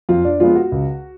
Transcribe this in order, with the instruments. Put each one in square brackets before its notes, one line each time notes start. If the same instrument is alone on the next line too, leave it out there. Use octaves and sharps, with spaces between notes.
[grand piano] F2 F4
D4
F3 G#3 B3 F4
F#4
C#2